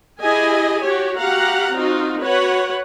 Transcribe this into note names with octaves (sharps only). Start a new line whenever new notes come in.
E4 G4 G#4 D#5 G#5
F#4 G4 C#5
F#4 G4 F5 F#5 A#5
C4 D#4 F4 F#4
F#4 B4 C#5 F#5